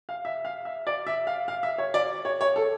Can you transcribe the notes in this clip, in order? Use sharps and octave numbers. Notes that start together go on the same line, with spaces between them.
F5
E5
F5
E5
D5
E5
F5
F5
E5
C#5
D5
C#5
C#5
A4